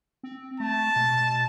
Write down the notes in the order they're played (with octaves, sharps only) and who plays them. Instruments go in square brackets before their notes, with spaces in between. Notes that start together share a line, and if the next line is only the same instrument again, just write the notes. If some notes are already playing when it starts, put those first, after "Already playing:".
[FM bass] C4
[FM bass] A3 [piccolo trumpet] A5
[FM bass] B2